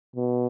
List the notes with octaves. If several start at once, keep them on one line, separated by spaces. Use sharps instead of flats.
B2